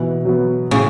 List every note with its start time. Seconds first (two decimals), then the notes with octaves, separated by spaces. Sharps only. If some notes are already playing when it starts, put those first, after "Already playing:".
Already playing: B2 E3
0.25 F#3 B3
0.71 A2 C#3